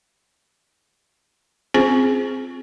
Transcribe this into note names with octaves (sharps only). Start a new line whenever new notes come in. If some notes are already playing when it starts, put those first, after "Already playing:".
C4 C#4 F4 G#4 C5